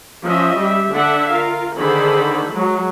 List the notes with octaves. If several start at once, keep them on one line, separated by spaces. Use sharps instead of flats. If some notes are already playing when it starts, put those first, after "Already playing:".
F3 C#4 F4 D#5 E5
G3 G4 E5
D3 D4 A4 E5 F#5
F4 A#4 F5
D3 D#3 G#4 A4 C5 B5
F#3 G#3